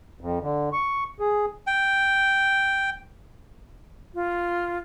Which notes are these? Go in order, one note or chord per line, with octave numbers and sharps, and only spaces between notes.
F2
D3
C#6
G#4
G5
F4